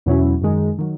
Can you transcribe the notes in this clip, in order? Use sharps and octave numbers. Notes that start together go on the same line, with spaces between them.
E2 B2 F#3 C#4 E4
F#2 D#3 G#3 D#4
D#3 F#3